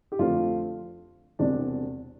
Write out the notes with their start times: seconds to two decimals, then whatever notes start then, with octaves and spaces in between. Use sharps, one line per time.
0.12 G4
0.19 F2 D3 A3 C4 F4
1.39 E1 E2 C3 G3 C4 D4